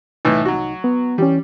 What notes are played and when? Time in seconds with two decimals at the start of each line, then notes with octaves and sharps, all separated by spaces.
0.25 C2 A2 E3 A3 D#4
0.45 F#3 F#4
0.84 B3
1.18 E3 G3 C#4